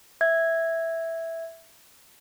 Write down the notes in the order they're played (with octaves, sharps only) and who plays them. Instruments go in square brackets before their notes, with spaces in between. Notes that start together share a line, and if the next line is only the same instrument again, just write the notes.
[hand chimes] E5 G#6